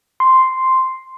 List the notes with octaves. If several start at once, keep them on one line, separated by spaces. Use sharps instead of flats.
C6